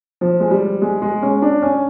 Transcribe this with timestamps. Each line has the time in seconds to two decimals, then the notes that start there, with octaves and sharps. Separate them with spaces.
0.21 F3
0.40 G#3
0.51 G3
0.82 G#3
1.02 G#3
1.22 C#4
1.42 D4
1.62 C#4